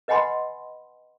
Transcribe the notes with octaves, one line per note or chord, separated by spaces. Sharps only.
B4 D#5 F#5 G#5 B5 C6